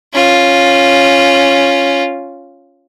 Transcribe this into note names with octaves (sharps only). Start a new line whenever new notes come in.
C#4 F4